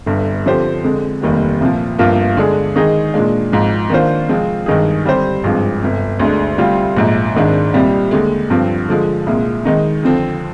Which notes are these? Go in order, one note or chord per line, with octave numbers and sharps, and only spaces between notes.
G1 G2 D3
D3 F3 C4 G4 C5
F2 D3 G#3
F1 D#2 D#3 G3 C4
C2 A#2 F3
G1 G2 F3 A#3 F4
D3 G#3 D4 G#4
D#3 G#3 D#4 G#4
A#2 G#3 D4
G#1 G#2 F3
D#3 A#3 D4 F4 C5
C3 F3 G#3 C4 F4
G2 D#3 G#3 D#4 G#4
D3 G3 C4 G4 C5
G#1 G2 F3 G#3
G1 F2 C3
D2 D3 G#3 D4
D2 C3 G3 C4 F4
A#1 G#2 F3
G#1 G#2 D#3 G#3 D4
C2 A#2 G3 C4 G4
D#2 D3 G#3
G2 D3 F3 C4
D3 F3 G#3
C2 A#2 G#3
D#3 G#3 D#4
F2 D3 F3 C4